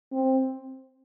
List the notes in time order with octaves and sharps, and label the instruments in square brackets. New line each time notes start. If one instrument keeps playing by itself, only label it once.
[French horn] C4